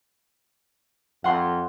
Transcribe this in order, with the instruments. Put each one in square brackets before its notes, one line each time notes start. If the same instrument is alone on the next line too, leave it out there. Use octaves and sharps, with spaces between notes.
[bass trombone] F2 [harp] F#5 C6